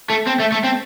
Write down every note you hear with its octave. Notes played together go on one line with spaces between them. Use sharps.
A3
C4
A3
A3
C4